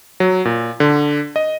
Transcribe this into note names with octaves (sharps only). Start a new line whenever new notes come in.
F#3
A#2
D3
D#5